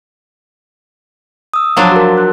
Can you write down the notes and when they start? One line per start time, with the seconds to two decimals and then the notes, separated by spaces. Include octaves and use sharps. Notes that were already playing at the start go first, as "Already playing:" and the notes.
1.54 D#6 E6
1.77 F3 F#3 D4 F5
1.92 F#4 A#4
2.17 F#6